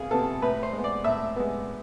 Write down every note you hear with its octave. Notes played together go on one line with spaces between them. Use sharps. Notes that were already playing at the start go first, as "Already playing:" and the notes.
Already playing: C2 B3 F4 G#4
C3 E3 B3 A4
A2 B4
C5
G#3 B3
D5
A2 E5
G#3 B3